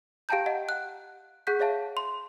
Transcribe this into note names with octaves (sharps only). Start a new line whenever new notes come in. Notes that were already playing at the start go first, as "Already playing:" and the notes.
G4 F5 G5 A5 A#5 G6
D#5 F#5
F#5 F#6
G#4 F#5 C#6 F#6 G6 B6
G#4 C#5 E5 F5 A5
C6